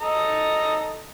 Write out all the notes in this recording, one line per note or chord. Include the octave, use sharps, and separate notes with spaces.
A4 D#5 A#5